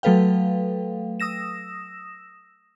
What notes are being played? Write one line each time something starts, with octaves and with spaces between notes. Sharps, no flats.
F#3 A3 A4 B4 F5 G5
D#6 E6 A#6 E7